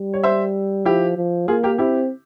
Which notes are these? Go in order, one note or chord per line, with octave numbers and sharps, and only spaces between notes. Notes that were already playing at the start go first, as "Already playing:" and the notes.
Already playing: G3
C#5
C5 E5
F3 E4 G4
F3
A#3 F4 G#4
G4 A#4
C4 E4 G4